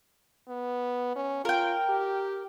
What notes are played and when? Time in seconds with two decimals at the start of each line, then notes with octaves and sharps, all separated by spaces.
0.48 B3
1.16 C#4
1.45 F4 A#4 G5
1.89 G4